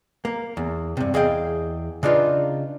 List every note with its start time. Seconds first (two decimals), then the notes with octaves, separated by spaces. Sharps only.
0.25 A#3
0.57 E2
0.97 G2 C3
1.14 E2 G#4 D#5 F5 G5
2.03 C#3 D4 D#4 F4 B4